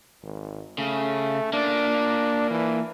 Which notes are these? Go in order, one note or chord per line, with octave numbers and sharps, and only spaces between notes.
G#1
C#3 A3
A#3 D4 D5
E3